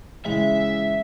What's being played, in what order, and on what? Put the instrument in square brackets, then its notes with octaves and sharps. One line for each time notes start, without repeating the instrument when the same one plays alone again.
[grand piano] C#3 E3 G#3 [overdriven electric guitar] E5